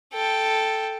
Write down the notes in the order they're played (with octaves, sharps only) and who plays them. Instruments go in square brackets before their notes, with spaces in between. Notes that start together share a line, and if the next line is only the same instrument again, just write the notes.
[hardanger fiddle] A4 G5